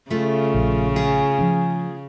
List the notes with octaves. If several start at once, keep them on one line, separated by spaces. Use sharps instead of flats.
C#3 A3 F4
A#1
F4 G#4
F3 C#4